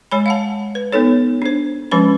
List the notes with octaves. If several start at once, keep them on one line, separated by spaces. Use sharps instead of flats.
G#3 C#5 G#5 B5
F5 F#5 A5
B4
B3 D#4 A4 C#5
D4 C5
F3 G#3 C#4 B4 B5